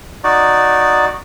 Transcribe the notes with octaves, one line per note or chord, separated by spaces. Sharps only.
D#4 F#4 D5